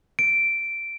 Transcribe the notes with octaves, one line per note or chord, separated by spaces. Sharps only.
D7